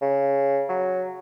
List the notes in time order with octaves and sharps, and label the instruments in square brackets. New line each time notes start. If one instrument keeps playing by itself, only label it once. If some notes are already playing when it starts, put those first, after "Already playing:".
[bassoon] C#3
F#3